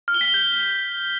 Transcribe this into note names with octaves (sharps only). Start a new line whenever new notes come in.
F6
G7
B6
G7
G6